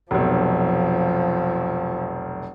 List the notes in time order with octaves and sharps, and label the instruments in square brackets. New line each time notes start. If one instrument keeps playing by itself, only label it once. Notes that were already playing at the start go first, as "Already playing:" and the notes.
[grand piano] F1 B1 [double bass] F3